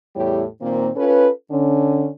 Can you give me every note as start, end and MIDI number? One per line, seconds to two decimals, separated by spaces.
0.16 0.44 40
0.16 0.44 45
0.16 0.44 55
0.16 0.44 64
0.16 0.44 67
0.16 0.44 73
0.62 0.90 46
0.62 0.90 51
0.62 0.90 58
0.62 0.90 60
0.96 1.29 61
0.96 1.29 65
0.96 1.29 69
0.96 1.29 71
1.51 2.08 50
1.51 2.08 61